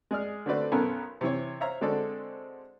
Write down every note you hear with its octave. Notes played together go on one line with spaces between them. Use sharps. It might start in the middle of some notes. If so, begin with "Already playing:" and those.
G#3 G#4 D5 F6
D3 A3 C4 F#4 B4 D5
B1 B3 C#4 A4 A#4 G#5
C3 E3 C#5
C5 C#5 E5 F5 A#5
D3 G#3 C4 F#4 A4 D5